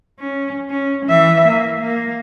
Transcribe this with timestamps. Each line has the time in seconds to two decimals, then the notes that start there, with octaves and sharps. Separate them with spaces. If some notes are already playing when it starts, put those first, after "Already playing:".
0.19 C#4
0.70 C#4
1.06 E3 E5
1.48 A#3
1.81 A#3